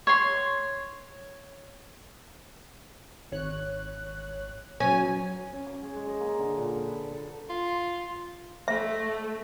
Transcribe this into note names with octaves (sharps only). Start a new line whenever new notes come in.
C#5 C6
G#1 C#5 F#6
F#3 C#4 G#5
C#4
D6
G#4
G#3
D#5
A#3
D3
A#2
A4
B4
A4
F4
A3 E5